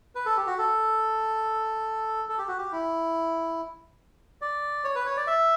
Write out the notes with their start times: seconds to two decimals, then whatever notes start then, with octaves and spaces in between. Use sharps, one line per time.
0.15 B4
0.26 A4
0.37 G4
0.47 F#4
0.58 A4
2.29 A4
2.38 G4
2.48 F#4
2.58 G4
2.72 E4
4.42 D5
4.84 C#5
4.95 B4
5.06 C#5
5.17 D5
5.27 E5